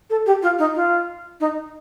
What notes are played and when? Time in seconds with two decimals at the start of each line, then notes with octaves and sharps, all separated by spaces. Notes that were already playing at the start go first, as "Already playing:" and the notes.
0.10 A4
0.26 G4
0.42 F4
0.58 D#4
0.75 F4
1.40 D#4